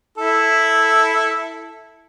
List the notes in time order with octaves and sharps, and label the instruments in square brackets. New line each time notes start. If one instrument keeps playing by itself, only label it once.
[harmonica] E4 A4